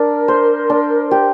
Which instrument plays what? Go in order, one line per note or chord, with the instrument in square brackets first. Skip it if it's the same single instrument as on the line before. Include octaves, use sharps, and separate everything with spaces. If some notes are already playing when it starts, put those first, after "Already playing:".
Already playing: [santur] D4 [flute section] A#4
[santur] C5
D4
G4